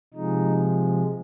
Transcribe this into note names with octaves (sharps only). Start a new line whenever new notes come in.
C3 F3 G#3 D#4